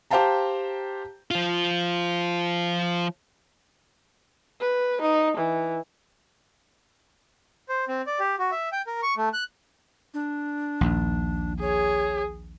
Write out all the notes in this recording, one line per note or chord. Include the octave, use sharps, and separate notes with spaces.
G4 C5 F5 G5 A5 A#5
F3 F4
B4
D#4
E3
C5
C4
D5
G4
F#4
E5
G5
A#4
C#6
A3
F#6
D4
A#1 D#2
G#4 C#5